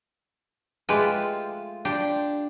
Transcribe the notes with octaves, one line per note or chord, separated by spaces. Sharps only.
G#3 A3 F4 G4 B4 G5
D4 G4 C6